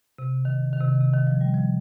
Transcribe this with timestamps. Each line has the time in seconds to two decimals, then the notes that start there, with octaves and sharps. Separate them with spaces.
0.18 C3
0.45 D#3
0.73 D#3
0.80 C3
0.88 D#3
1.00 C3
1.14 D#3
1.27 F3
1.41 G3
1.54 F3